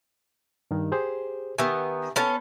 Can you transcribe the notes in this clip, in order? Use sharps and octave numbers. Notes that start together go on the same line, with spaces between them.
G2 D#3
G4 G#4 C5
D#3 B3 G4 E5 G#5
B3 C#4 A4